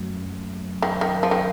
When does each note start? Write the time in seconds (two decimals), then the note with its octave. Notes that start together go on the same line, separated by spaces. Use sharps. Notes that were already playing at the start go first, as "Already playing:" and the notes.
Already playing: F#2 A3
0.82 D#3
1.01 D#3
1.23 F3
1.31 D#3